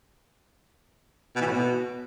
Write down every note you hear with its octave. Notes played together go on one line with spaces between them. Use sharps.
B2
E3
A2
B2